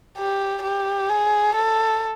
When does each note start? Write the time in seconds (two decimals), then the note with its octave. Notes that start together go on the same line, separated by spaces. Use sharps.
0.18 G4
0.63 G4
1.10 G#4
1.56 A4